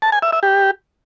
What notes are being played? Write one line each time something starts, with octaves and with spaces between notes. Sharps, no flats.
A5
G#5
E5
E5
G4